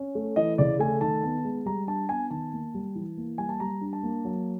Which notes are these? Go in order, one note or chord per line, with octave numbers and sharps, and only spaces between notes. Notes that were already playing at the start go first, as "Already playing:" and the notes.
Already playing: C#4
A3
E3 D#5
C#3 D5
A3 G#5
D#3 A5
B3
G#3
G3 A#5
D4 A5
B3 G#5
D#3 A5
A#3
G3
E3
A#3
G3 G#5
A5
G3 A#5
D4
A5
A#3
F#3